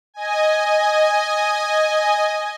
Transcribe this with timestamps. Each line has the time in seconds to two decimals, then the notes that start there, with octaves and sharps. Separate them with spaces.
0.14 D#5 G#5